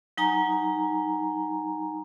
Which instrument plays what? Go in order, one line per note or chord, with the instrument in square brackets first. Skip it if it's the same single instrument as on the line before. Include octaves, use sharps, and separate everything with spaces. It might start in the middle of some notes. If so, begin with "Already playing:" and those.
[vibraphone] F#3 D#4 G#5 A#5